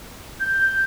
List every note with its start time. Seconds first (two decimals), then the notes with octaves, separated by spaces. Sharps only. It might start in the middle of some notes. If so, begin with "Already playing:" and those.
0.40 G6